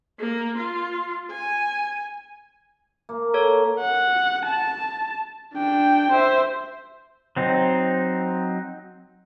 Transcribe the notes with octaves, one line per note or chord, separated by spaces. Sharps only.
A#3
F4
G#5
A#3
A4 C#5
F#5
A5
D4 G5
C5 E5
F#3 C4 D#4